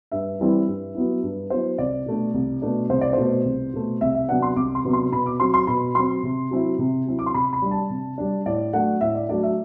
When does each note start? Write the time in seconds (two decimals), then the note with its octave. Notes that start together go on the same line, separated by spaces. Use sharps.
0.12 G2 E5
0.40 E3 G3 C4 E4
0.68 G2
0.95 F#3 B3 E4
1.23 G2
1.50 F#3 B3 E4 C5
1.78 C2 D5
2.06 B2 A3 D4
2.34 C2
2.62 B2 A3 D4
2.90 C2 C5
3.01 D5
3.13 B2 A3 C5
3.45 C2
3.73 B2 A3
4.01 C2 E5
4.15 E5
4.28 C3 F#3 B3 D4 F#5
4.42 C6
4.56 C2 D6
4.75 C6
4.84 C3 F#3 B3 D4
4.93 C6
5.12 B2 B5
5.26 D6
5.40 F#3 C4 C6
5.54 C6
5.67 B2 B5
5.95 F#3 C4 C6
6.23 C3
6.51 F#3 C4 E4
6.79 C3
7.06 F#3 C4 E4
7.19 D6
7.26 C6
7.34 C3 B5
7.53 B5
7.62 G3 D4
7.71 A5
7.90 C3
8.18 G3 D4
8.46 A2 D5
8.73 F#3 A3 D4 F#5
9.01 A2 E5
9.15 D5
9.29 F#3 A3 D4 D5
9.43 E5